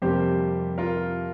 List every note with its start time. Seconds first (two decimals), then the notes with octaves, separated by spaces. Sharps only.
0.02 F2 C3 G3 A#3 G4 C5
0.78 F4 A#4